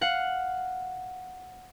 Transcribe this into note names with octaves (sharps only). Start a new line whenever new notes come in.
F5 F#5